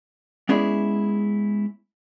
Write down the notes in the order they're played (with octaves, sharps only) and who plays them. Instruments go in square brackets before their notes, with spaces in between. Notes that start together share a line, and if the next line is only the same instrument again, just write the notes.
[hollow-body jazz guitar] G#3 B3 C#4 E4 G#4 D5